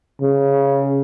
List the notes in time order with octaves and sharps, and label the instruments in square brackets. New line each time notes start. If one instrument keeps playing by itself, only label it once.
[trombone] C#3